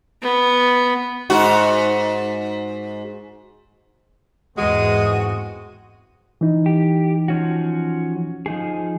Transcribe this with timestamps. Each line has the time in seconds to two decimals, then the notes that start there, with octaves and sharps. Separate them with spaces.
0.22 B3
1.30 G#2 F#4
4.58 E2 G#2 G#3 C4 F#4 D#6
6.41 E3 D#4
6.66 G4
7.28 F3 C#4 F#4
8.46 F3 D#4 G#4